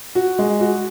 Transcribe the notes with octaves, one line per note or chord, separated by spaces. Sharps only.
F#4
G#3
F#4